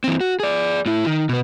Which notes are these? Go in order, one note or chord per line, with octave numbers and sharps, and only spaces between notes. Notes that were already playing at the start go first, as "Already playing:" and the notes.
E3 C4
F#4
G#4 D5
A2 E4
D#3
B2 B3